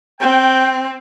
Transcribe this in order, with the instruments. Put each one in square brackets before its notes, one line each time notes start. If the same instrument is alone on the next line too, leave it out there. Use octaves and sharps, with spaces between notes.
[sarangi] C4 [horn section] G5